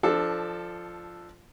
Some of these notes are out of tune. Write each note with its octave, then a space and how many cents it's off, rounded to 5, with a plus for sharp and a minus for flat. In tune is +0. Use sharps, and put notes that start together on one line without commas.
F3 -5 D4 +20 A4 +0